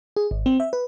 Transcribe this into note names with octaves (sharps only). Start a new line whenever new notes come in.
G#4
G#1
C4
E5
B4